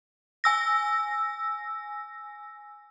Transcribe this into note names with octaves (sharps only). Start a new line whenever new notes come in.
G#5 E6 A#6